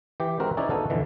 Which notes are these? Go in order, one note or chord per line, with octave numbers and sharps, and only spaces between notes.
E3 G4
G#3 C4 F#4 A#4
C#4 D#4 E4 G#4 B4 D5
B3 D#4 F#4 A4 F5
F2 B2 D3 E3